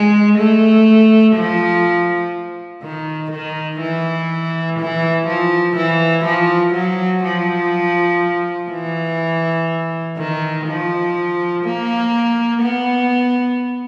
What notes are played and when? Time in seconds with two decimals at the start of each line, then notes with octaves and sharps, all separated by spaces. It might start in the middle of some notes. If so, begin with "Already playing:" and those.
Already playing: G#3
0.38 A3
1.36 F3
2.83 D#3
3.31 D#3
3.81 E3
4.80 E3
5.28 F3
5.77 E3
6.25 F3
6.74 F#3
7.24 F3
8.71 E3
10.17 D#3
10.67 F3
11.65 A#3
12.62 B3